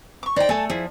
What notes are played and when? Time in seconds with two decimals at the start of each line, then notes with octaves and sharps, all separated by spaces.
0.23 C#6 D6
0.36 D#4 C5 D5 G5 A#5
0.49 A3 A4 G#5 A5
0.70 F3 E4 G#4